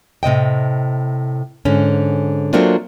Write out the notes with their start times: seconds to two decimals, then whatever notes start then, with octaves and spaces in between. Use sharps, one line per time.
0.23 A2 C3 D#5 G5
1.65 G#2 D3 C#4
2.53 F#3 A3 A#3 C4 D4 F4